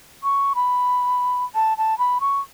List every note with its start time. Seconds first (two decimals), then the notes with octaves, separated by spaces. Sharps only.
0.23 C#6
0.55 B5
1.55 A5
1.78 A5
1.99 B5
2.21 C#6